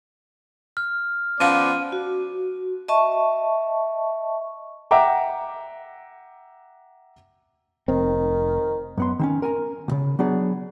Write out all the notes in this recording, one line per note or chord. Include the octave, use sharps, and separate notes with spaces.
F6
F3 B3 C#4 D5 F5 D6 D#7
F#4
D#5 E5 A5 C#6
E5 F#5 G5 A#5 D6
F1 D#3 C4
F#2 B3 C6
D#3 C4 C#4
A#4 G#5 A#5
C2 C#3
F#3 B3 D4 G#4